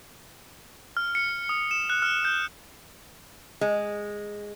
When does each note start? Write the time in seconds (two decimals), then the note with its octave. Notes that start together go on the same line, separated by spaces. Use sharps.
0.97 F6
1.15 C#7
1.49 D#6
1.71 E7
1.90 F#6
2.02 F6
2.25 G6
3.61 G#3